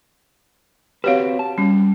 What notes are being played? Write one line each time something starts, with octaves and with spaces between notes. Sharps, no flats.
C4 F#4 G4 B4 C#5 F5
A5
G3 C#4